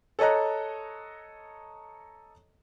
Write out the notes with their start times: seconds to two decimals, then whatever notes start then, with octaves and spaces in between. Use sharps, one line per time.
0.19 A4 C#5 D#5 A#5 F#6